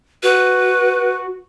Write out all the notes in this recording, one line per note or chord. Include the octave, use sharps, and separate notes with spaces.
F#4 B4